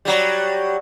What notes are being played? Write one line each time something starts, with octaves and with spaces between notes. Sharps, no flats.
F#3 G3